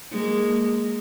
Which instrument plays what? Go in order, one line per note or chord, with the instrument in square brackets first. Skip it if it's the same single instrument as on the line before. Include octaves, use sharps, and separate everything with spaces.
[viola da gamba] G#3 A#3